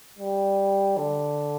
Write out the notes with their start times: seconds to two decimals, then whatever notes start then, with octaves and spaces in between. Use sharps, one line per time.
0.19 G3
0.97 D3